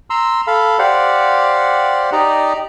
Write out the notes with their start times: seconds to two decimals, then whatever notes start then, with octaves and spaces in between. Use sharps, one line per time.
0.10 A#5 C6 E6
0.47 A4 F5 B5
0.79 G4 C5 D5 F5 F#5
2.12 D#4 G4 D5 D#5 A#5